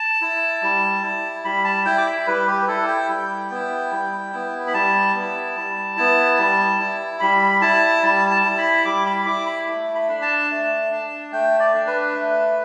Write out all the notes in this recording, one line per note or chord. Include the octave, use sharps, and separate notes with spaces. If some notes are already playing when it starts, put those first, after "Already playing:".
Already playing: A5
E4
G3
E4
G3 B5
A5
E4 G5
D6
B5
G3 B4
G4
B4
E4 A4
G5
G3
B3 E4
G3
B3 E4
B5
G3 A5
B3 E4
G3
B3 E4
G3
E4
G3 B5
E4 A5
G3 A5
A5
E4
B5
G3 D6
B5
E4 D6
B5
A3
B5
D4
A5
A3
D4
A3 G5
D5
D4
B4
A3